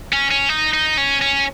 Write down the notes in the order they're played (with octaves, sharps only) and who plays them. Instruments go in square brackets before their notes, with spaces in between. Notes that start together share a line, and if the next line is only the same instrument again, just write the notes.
[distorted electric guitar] C#4
C#4
D#4
D#4
C#4
C#4